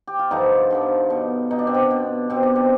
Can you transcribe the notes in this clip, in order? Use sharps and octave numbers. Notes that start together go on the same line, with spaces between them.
G4
F4
G2 D3 F3 D#4
G2 D3 F3
B2
B2 D#4
D4
C4
D4
B2
B2 C4
D4
C4